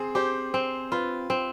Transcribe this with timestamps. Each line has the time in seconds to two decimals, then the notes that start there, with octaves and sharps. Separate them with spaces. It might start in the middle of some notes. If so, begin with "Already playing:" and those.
Already playing: C4 G#4 C5
0.15 G4 C5
0.54 C4
0.92 F4 B4
1.30 C4